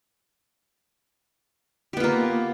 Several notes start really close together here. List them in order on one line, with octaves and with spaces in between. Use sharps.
G4 B3 F4 A#3